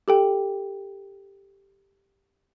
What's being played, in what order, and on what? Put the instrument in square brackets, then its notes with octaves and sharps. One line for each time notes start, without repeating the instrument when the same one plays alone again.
[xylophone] G4 A4 G5